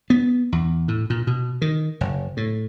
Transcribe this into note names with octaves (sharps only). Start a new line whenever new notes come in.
B3
E2
A2
A#2
B2
D#3
F#1
A2